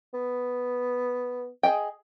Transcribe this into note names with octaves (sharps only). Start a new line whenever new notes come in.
B3
G#4 D#5 G5